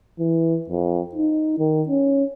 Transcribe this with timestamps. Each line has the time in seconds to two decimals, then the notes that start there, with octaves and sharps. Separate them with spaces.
0.19 E3
0.69 F2
1.14 D#4
1.59 D#3
1.88 C#4